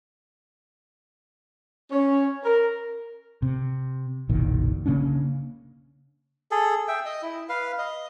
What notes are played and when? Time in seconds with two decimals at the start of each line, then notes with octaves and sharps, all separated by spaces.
1.91 C#4
2.44 A#4
3.42 C3
4.29 F#1 B1 A#2 D#3
4.86 C#3 A#3 C#4 D4
6.51 G#4 A4
6.88 E5 G5
7.06 D#5
7.23 E4
7.49 B4 F5
7.79 D#5